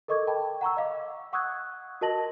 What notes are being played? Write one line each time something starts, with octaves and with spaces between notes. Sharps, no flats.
A4 A#4 D#5 C#6 D6 G#6
D#5 G5 A5 B5
F#5 A#5 C#6 E6
D#5 F5 D6
F#5 C#6 D#6 E6 F#6 G#6
F#4 A#4 D#5 A5 A#6 F#7